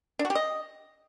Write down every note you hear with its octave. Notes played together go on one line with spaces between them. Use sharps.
D4
F#4
G4
D#5